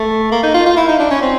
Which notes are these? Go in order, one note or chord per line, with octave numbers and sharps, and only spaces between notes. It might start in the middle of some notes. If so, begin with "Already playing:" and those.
Already playing: A3
A#3
D#4
F4
F4
E4
D#4
D4
C#4
C4